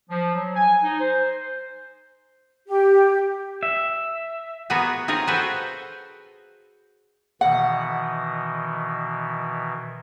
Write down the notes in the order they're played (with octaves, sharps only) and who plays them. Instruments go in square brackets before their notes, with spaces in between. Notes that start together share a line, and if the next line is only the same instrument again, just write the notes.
[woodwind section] F3
F#3
G#5
D#4
C5
[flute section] G4
[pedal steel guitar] E5
[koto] A#3 B3 F4 F#4 G#4 A#5
C4 F4 G#4 A#4 C#5
F#4 G#4 A4 B4 C5 G5
[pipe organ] B2 D#3 E3 [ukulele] F#5